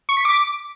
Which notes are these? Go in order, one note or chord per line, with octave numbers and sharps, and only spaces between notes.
C#6
B6
D6